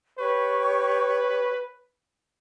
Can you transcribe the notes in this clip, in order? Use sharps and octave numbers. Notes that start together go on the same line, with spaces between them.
G4 B4 C#5 C#6